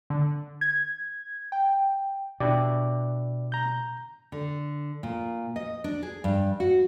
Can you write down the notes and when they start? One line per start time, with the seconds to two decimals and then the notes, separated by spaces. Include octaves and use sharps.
0.10 D3
0.61 G#6
1.52 G5
2.40 B2 D4 E4 G4 D5
3.52 A#5 G6
4.32 D3
5.03 A#2
5.56 D#5
5.84 D4
6.03 G#4
6.24 G2
6.60 F#4